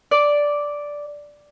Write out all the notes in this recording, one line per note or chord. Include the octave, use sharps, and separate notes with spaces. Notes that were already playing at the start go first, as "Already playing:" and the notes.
D5